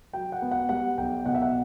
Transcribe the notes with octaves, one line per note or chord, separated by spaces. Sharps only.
F#3 G5
F#5
B3
F#5
G3 F#5
B1 G5
B2 F#5
E5
F#5